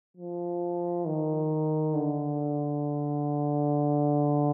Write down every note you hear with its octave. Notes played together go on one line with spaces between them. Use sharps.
F3
D#3
D3